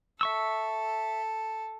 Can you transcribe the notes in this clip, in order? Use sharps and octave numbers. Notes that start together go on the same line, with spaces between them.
A4 E5 C#6 E6